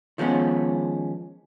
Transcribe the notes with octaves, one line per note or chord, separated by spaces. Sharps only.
D#3 F3 G#3 B3 C#4